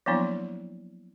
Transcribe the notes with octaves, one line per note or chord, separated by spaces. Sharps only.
F3 F#3 A#3 B3 D4 E4